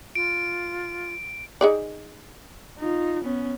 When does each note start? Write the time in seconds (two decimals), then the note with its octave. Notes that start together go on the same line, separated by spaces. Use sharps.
0.15 F4 D7
1.61 D#4 G#4 D5
2.79 D#4 F4
3.24 B3 C#4